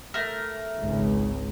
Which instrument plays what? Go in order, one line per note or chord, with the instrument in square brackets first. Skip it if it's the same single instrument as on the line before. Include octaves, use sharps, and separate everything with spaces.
[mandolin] A3 A#4
[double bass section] G#1 C#2